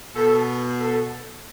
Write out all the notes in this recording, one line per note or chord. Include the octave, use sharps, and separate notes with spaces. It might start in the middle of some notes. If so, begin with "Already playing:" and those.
B2 A4
A4